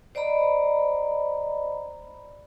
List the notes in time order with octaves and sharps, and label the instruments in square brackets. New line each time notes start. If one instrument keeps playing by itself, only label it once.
[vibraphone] C5 D5 D#5 A#5 B5